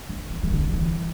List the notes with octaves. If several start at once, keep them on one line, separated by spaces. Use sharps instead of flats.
D3
E3
E3
D3
E3